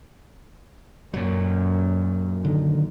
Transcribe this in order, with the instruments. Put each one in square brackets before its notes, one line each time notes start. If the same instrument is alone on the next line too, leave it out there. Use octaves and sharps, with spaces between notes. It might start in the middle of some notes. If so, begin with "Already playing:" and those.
[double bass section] F#2 [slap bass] A#2 F#3
[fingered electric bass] D3 D#3